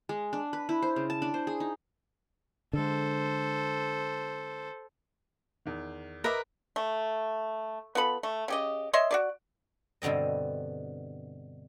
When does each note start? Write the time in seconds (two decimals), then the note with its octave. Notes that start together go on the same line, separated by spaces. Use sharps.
0.09 G#3
0.33 D4
0.53 B4
0.69 E4
0.82 C5
0.96 C#3
1.10 A5
1.22 D4
1.34 C5
1.47 G#4
1.60 D#4
2.73 D3 G#3 A4 C5
5.66 E2 D#3
6.24 A#4 B4 D#5 E5 A#5 D6
6.76 A3
7.95 B3 F4 A4 B5
8.23 A3
8.48 C#3 G4 D#5
8.93 C#5 D#5 E5 C6
9.11 F#4 G#4 D5
10.02 G2 B2 D3 C4 D#5